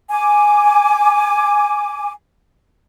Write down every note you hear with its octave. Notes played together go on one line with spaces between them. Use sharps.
G#5 D6